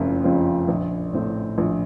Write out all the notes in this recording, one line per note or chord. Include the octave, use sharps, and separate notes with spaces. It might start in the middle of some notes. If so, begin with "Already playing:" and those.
Already playing: F#1 F2 C#3 F3
F2 C#3 F3 C4
A#1
A2 A3 C4
A#1